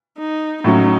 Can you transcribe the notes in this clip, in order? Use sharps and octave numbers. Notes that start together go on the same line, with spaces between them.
D#4
A2 F#3 C#4 D#4